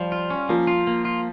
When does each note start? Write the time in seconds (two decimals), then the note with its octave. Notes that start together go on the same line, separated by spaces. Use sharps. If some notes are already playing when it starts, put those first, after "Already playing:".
Already playing: F3 G3
0.12 F4
0.30 C#4
0.49 F3 A#3
0.67 F4
0.87 A#3
1.05 F4